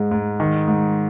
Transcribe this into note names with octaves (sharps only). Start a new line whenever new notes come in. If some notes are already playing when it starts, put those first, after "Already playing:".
Already playing: G#2 G#3
G#2
D#3
G#2